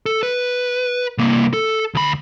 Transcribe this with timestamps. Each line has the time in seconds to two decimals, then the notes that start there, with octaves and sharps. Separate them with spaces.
0.06 A4
0.23 B4
1.18 C2 A#3
1.53 A4
1.95 D2 B5